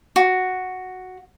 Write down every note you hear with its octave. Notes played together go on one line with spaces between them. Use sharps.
F#4